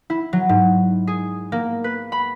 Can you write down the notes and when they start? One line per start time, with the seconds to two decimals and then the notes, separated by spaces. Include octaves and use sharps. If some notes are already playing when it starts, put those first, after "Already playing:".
0.10 E4
0.33 F#3
0.49 G#2
1.07 G#4
1.52 A#3
1.84 B4
2.12 B5